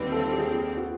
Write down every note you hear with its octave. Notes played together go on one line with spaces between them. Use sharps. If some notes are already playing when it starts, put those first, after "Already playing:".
Already playing: D#2 D3 G3 C4 B4
A4
G4
G#4
F#4